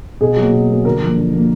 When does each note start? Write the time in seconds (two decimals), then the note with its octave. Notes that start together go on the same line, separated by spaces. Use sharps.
0.21 B2 G#4
0.37 F#3 A#3
0.52 B2
0.68 F#3 A#3
0.85 D3 A#4
1.01 F3 A#3
1.17 D3
1.33 F3 A#3